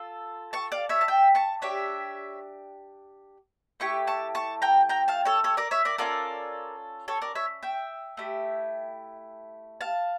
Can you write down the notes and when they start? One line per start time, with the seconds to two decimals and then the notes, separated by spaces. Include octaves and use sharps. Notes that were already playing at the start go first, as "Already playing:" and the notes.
Already playing: F4 A4
0.53 A5 C#6
0.72 D5 F5
0.89 C#5 E5
1.01 A5
1.08 E5 G5
1.35 A5 C#6
1.62 D4 G4 C#5 E5
3.80 A3 E4 G4 C#6
4.07 A5 C#6
4.35 A5 C#6
4.62 G5 A#5
4.89 G5 A#5
5.08 F5 A5
5.25 A4 C#5
5.44 A4 C#5
5.57 A#4 D5
5.71 C#5 E5
5.85 A#4 D5
5.98 C#4 F4 A4 A#4 D5
7.08 A4 C#5
7.22 A#4 D5
7.35 C#5 E5
7.63 E5 G5
8.17 A3 E4 G4
9.81 F5 A5